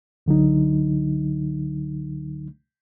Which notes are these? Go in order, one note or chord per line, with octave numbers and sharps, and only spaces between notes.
C#2 D3 F#3 D#4